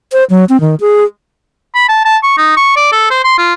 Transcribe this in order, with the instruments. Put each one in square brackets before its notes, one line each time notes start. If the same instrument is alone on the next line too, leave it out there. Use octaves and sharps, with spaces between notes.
[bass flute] C5
F#3
C4
D#3
G#4
[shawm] B5
A5
A5
C#6
D#4
C#6
D5
A4
C5
C6
F4